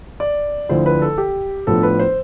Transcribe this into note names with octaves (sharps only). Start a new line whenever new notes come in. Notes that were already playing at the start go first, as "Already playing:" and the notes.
D5
D2 D3 F3 A3 E4 C5
B4
A4
G4
A2 F3 B3 D4 A4
B4
C5